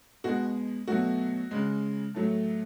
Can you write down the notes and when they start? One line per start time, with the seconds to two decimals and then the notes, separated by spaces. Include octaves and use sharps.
0.24 B2 G#3 F#4
0.87 B2 F#3 A3 F#4
1.51 C#3 G#3
2.14 A2 F#3 A3